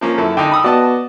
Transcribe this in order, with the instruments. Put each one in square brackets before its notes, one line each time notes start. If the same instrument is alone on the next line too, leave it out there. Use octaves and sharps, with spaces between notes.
[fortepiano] F3 A#3 C#4
F#2 E4 A4
[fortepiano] D3 D#4 [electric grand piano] G5 A5
[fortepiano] B5 D#6 E6
[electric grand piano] B3 F#4 [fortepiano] D5 D#5 A5